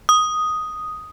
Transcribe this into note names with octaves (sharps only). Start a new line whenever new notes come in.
D#6